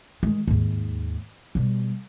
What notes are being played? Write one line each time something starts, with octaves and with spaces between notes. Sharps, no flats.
D#3 G#3
D#2 G#2
B2 G3